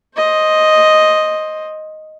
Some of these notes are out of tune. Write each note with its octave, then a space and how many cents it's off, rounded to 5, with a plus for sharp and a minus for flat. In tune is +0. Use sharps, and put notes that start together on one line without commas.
C5 +15 D#5 +0